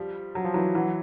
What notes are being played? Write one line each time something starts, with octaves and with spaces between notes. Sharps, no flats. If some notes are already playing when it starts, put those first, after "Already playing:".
Already playing: F3 G3
F#3
F3
E3 F#3
E3 F#3